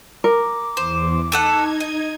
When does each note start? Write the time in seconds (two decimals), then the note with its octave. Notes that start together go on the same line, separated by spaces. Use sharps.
0.24 A#4 D6
0.77 E2 C5
1.32 A3 D#4 A4 F#5 G#6
1.80 D#5